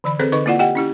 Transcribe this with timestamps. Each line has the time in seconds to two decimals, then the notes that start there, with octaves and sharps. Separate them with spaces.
0.04 D3 E3 B5
0.19 C4 G#4 A4 B4 C5
0.32 D3 D#4 A4 B4 D#5 C#6
0.46 A#3 E4 F4 D5 F#5
0.59 G4 D#5 F#5 G5
0.75 C#4 E4 G4